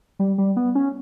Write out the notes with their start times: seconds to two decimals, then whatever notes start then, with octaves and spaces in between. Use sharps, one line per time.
0.19 G3
0.38 G3
0.57 B3
0.75 C#4